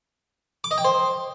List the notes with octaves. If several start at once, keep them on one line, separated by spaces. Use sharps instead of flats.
D6
D#5
G5
C5